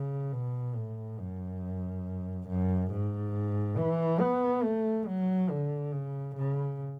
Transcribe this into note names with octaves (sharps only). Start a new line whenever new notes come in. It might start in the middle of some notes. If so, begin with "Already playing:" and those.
Already playing: C#3
B2
A2
F#2
F#2
G#2
E3
B3
A3
F#3
D3
C#3
C#3